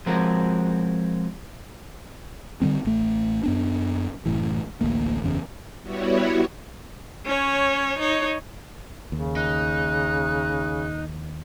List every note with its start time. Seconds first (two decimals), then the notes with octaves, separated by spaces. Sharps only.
0.06 F3 G#3 C4 F#4 A#4
2.62 D3 D#3 G3 C4
2.85 A1 A3
3.43 F#2 B3 D4
4.26 F#1 A2 E3
4.81 A1 D2 A#3
5.22 F#1 E2 C#3
5.82 G3 B3 E4 F#4 C#5
7.25 C#4 C#5
7.98 D#4 C#5
9.12 D#2 C#3
9.36 D#4 F#6